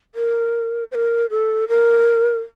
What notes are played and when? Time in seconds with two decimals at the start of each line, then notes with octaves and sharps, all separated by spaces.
0.15 A#4
0.91 C5
0.95 A#4
1.30 A4
1.68 A#4